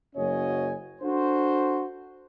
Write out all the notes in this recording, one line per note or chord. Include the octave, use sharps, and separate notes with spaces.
F#1 F#3 C#4 C#5 D#5 G#5
D4 F#4 A4 C5